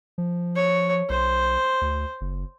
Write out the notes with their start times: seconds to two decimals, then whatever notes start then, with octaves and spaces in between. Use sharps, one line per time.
0.18 F3
0.55 C#5
1.09 B1 C5
1.81 D2
2.21 F#1